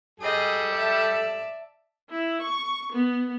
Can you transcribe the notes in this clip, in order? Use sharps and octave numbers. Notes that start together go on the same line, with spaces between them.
G3 G#4 A4 D#5
D5 E5 A5
E4
C#6
B3